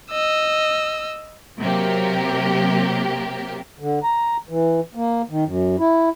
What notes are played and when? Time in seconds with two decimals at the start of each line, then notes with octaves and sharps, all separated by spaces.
0.11 D#5 E6
1.59 C3 F#3 A#3 G4 A#4
3.80 D3
4.03 A#5
4.49 E3
4.95 A#3
5.30 D#3
5.45 F#2
5.79 E4